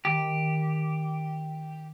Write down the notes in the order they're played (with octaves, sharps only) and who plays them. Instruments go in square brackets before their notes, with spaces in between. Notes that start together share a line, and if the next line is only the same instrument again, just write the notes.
[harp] D#3 [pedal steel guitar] G4